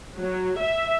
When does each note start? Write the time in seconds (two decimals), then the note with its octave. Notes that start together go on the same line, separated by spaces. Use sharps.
0.17 F#3
0.61 E5